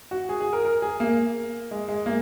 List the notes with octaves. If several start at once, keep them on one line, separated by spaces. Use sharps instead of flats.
F#4
G#4
G#4
A#4
A#4
G#4
A#3
G#3
G#3
A#3